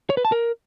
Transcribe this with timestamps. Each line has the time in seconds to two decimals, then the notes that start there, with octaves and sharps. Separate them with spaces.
0.10 C#5
0.17 B4
0.25 A5
0.32 A#4